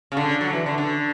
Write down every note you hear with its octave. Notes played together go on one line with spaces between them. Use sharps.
C#3
D3
F#3
E3
D3
D3